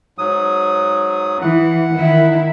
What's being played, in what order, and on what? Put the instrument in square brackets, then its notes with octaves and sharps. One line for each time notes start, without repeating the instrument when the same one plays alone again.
[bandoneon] G#2 F#3 D#6
[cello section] E3 [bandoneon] F#5
[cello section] D#3 E4